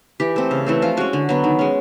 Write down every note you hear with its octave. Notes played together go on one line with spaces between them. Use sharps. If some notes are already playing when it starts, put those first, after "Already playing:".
E3 G4
A3 C4
C#3
E3 A3 C4
F3 F4
G#3 C#4 F#4
D3
F#3 B3
D#3
G#3 C#4